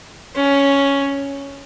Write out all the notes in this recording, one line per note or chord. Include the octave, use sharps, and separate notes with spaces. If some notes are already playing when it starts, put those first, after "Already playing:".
C#4